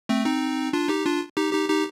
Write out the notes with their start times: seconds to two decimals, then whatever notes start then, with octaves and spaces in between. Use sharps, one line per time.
0.09 A3 C4
0.25 C4 D#4
0.73 D4 F4
0.89 D#4 G4
1.05 D4 F4
1.37 D#4 G4
1.53 D#4 G4
1.69 D#4 G4